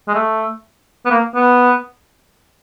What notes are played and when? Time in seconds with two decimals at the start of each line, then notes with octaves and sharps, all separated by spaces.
0.08 G#3
0.14 A3
1.05 B3
1.10 A#3
1.35 B3